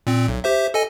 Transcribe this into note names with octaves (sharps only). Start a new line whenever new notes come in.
A#2 C4
B1
G4 C5 E5
A4 D#5 G#5